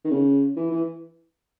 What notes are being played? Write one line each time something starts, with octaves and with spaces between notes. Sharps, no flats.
D#3
C#3
E3
E3